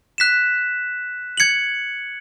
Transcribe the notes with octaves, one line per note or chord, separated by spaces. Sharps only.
F#6 B6 E7
G#6 C#7 F#7